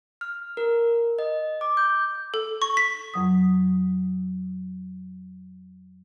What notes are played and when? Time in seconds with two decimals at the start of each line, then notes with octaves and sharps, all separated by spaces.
0.21 F6
0.57 A#4
1.19 D#5
1.61 D6
1.77 G6
2.34 A4
2.62 C#6
2.77 B6
3.14 F2 F#3 D#6